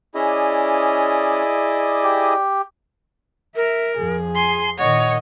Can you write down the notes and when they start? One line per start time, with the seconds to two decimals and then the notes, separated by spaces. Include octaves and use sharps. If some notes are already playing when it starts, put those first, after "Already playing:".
0.15 C#4 E4 G#4 D5 D#5
2.03 G4
3.56 A#4 E5
3.97 F2 F3 G#4
4.35 G#5 C6
4.78 A#2 D#3 C#5 D#5 F#5